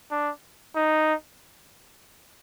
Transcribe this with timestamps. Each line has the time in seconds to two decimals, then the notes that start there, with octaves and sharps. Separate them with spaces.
0.11 D4
0.75 D#4